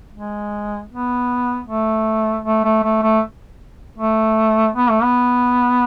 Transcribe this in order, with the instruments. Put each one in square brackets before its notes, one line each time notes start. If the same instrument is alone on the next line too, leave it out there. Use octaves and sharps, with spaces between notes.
[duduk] G#3
B3
A3
A3
A3
A3
A3
A3
B3
A3
B3